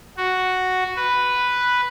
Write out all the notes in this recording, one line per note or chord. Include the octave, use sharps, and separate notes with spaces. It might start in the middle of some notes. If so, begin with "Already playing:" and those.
F#4
B4